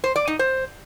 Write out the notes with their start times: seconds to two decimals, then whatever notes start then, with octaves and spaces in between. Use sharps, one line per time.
0.04 C5
0.16 D5
0.27 D#4
0.39 C5